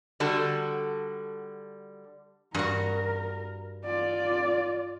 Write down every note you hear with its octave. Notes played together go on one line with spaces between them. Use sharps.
D3 G3 F#4 A4
G2 F#4 A#4
F4 D5